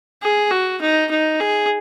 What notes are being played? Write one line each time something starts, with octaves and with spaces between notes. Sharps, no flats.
G#4
F#4
D#4
D#4
G#4